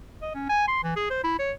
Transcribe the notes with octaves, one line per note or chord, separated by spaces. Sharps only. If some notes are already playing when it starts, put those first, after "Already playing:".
D#5
C#4
G#5
C6
E3
G#4
C5
E4
C#5